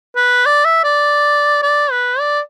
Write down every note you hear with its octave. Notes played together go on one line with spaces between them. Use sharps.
B4
D5
E5
D5
D5
B4
D5